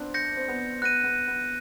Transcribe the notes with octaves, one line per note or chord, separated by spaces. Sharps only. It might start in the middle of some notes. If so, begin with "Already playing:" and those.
Already playing: B3 C4 D4
G6 A#6 C#7
C4
B3
B3 F#6 A#6 D#7
B3
B3